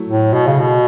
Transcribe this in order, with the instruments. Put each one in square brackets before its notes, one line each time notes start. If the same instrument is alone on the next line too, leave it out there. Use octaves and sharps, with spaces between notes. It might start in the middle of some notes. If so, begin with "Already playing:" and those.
Already playing: [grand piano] F#3 A3 E4
[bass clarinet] A2
B2
C#3
B2